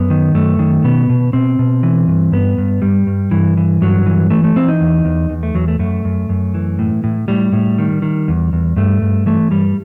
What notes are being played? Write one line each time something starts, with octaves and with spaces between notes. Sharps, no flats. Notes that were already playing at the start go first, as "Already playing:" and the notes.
Already playing: F#2 B3
D#3
F#2 A3
D#3
B2 B3
B2
B2 C4
B2
E3
G2
G2 B3
G2
G2 G3
G2
G2 E3
E3
G2 F#3
E3
E3 A3
A3
E3 C4
D#4
E2
E2
E2
A3
E2 F#3
A3
F#2 A3
F#2
F#2
E3
A2
A2
A2 G3
A2
D#3
D#3
E2
E2
G2 A3
G2
E3 A3
G2 G3